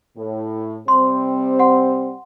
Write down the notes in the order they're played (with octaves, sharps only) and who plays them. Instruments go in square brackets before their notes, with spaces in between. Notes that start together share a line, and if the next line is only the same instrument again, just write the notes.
[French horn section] A2
[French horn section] C3 G3 C4 [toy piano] C6
[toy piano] F#5 C6